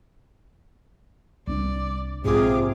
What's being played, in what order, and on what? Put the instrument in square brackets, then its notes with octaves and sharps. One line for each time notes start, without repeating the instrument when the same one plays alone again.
[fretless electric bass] C2 C4 D4 [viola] D5
[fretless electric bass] A#1 G#2 [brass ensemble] C3 [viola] F4 D6 [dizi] G#4